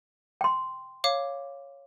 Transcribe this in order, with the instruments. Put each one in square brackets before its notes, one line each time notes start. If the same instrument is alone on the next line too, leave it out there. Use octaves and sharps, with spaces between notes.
[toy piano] G5 C6
[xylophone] C#5 F5 D6